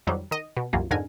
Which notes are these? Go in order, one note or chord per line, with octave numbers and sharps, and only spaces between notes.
F2 D#3 F#3 G3
D#3 D#5
B2
C2 F#2 E3 F#3 A#3 F4
F2 G#2 D3 A#4 G#5